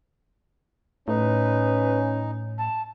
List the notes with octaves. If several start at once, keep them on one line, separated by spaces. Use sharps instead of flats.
A2 C#4 D#4 B4
A5